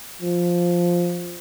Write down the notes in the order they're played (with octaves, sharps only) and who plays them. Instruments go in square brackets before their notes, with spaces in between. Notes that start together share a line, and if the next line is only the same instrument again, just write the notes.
[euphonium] F3